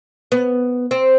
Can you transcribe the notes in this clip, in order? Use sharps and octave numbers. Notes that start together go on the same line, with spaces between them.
B3
C4